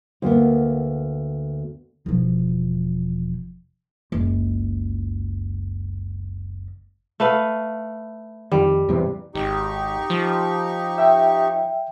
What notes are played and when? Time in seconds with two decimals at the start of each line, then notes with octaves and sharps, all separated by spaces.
0.22 D2 A#3 B3
2.06 E1 F3
4.12 F#1 C#2
7.20 A3 B4 F5
8.52 F2 D#3 G3
8.89 E2 G2 C3
9.35 G#1 D#4 G4 C#6
10.10 F3
10.98 E5 G5